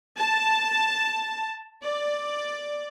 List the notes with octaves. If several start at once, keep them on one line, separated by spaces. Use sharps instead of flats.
A5
D5